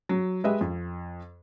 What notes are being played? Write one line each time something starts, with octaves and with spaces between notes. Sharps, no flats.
F#3
G#3 G4 B4 D#5 E5
F2